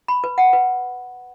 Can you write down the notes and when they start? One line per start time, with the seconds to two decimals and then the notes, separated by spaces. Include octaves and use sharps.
0.08 B5
0.24 B4
0.38 F#5
0.53 B4